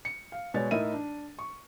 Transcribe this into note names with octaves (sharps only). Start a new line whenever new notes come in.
C#7
F5
B2 G#3 C#5 D5 A6
A2 D#4 E4 A#4 E5 D#7
D4
C#6